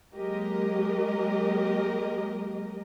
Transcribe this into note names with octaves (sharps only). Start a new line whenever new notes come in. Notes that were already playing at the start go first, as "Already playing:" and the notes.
F#3 G#3 A#3 G4 A#4 D#5